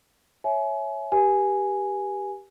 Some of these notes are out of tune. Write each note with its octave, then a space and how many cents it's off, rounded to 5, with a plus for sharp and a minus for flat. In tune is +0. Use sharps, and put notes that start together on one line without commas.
C#5 -5 E5 +0 G#5 +35
G4 +0 B4 -45 G#5 +0